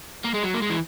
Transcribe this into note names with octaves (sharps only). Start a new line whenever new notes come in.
A#3
G#3
F#3
A#3
G#3
E3